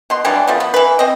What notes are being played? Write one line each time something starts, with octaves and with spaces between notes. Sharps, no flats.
B2 C6
E3 F#3 G3 D4
F3 A3 B3
B3
E3 B4
C4 D#5